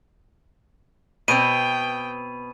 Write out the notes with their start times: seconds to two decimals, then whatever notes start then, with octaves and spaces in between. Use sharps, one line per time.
1.28 B2 C4 G5 D#7